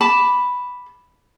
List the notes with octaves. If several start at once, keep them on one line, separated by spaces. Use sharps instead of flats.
A5 B5 D6